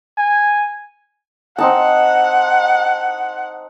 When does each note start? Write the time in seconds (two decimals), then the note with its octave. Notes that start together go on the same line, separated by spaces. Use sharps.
0.18 G#5
1.58 C4 D#4 F#5 A5